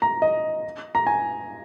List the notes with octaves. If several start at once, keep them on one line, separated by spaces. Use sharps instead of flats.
A#5
D#5
A#5
G#5